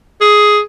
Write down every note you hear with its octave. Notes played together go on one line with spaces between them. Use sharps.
G#4